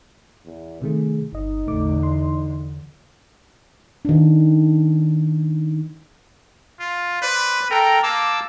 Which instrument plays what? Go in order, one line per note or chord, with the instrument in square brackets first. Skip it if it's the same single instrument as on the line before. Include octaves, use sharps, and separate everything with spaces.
[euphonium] E2
[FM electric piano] C3 D#3 A3 [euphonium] G#4
[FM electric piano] G1 D#5 [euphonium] D#4
[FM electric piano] A1 A3 D6 [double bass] E2 D3
[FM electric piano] C6
[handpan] D#3 D4
[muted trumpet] F4
[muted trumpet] B4 [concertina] C5 D5
[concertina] A4 G5 A#5 [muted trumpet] A#4
[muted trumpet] A#3 [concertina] A5 D6 E6